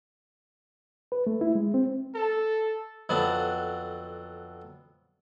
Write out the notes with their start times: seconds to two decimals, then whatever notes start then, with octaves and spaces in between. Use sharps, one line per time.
1.12 B4
1.27 A3
1.41 E4
1.55 G#3
1.74 C4
2.15 A4
3.09 F2 D3 F#3 B3 D4